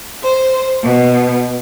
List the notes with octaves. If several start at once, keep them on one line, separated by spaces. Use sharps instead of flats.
C5
B2